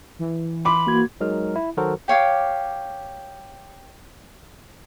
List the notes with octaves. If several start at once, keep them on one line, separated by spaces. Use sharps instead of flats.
E3
B5 C6 D6
A#3 F#4 G#6
F#3 G#3 D#4 A#4 F6
E4
D#3 F#3 F#4 A4 A#4 C5
G4 C#5 F5 D6